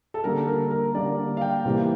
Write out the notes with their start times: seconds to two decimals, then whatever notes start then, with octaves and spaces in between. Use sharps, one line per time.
0.14 A4
0.24 D3 G3 A#3 A#4
0.48 A#4
0.71 A#4
0.95 D3 G3 A#3 D5
1.37 F5
1.41 G5
1.65 C3 E3 G3 A#3